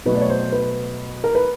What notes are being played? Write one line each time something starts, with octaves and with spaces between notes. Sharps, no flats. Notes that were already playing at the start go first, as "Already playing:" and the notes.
B2 F#3 A3 B4
D5
C#5
C5
B4
A#4
B4